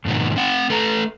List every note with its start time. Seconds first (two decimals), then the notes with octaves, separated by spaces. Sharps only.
0.05 F2 G#2 B2 D#3
0.36 C4 F#5 G5
0.70 A3 A4 B4 A#5